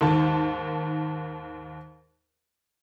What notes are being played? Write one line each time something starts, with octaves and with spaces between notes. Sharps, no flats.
D#2 G#2 D#3 A5